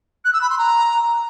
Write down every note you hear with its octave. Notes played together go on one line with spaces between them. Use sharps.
F#6
E6
B5
C6
A#5